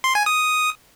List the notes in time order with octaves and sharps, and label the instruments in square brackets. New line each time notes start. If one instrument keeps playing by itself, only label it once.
[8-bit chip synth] C6
G#5
D#6